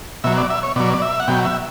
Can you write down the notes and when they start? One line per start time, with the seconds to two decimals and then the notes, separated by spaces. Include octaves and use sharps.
0.24 B2 F#3 E5
0.38 D5
0.50 E5
0.63 C#5
0.76 B2 F#3 D5
0.94 D5
1.02 E5
1.20 F#5
1.28 B2 F#3 G5
1.45 E5